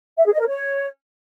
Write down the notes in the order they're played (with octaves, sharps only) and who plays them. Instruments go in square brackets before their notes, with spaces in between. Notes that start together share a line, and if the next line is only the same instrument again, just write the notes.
[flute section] E5
G#4
D#5
A#4
C#5